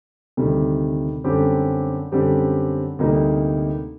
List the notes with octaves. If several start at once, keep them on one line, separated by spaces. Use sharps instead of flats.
D2 C3 D#3 G3
F#2 D3 G3 C4 G4
F#2 D3 G3 C4 G4
D2 C3 G3 A#3 D#4